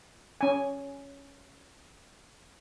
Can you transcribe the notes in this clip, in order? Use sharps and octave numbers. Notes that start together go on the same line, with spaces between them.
C#4 G#5